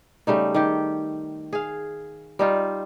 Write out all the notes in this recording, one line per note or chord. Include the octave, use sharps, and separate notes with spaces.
C#3 G3 A3 D#4
D#3 G4
G#4 F5
G3 D#4 F4